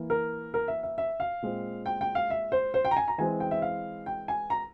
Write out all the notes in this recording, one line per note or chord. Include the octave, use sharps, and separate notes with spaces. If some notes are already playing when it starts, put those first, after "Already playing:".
Already playing: E3 A#3
A#4
A#4
E5
E5
E5
F5
A#2 G#3 C4
G5
G5
F5
E5
C5
C5
G5
A#5
G#5
A#5
E3 G#3 C4 G#5
G5
E5
F5
G5
G#5
A#5